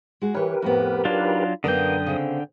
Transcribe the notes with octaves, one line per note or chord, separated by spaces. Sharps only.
G#3 F#4
E3 G4 A#4 B4 C#5
F2 A2 B3
F#3 D4 D#4 F4
F#2 D3 A#3 B3 A#4 G5 D#6
C#3 C4